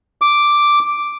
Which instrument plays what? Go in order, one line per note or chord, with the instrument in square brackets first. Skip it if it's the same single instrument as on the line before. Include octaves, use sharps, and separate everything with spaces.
[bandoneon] D6